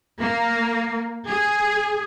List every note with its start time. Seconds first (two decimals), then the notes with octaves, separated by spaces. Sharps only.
0.21 A#3
1.28 G#4